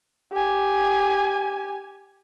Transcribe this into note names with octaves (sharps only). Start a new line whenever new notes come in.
G4 G#5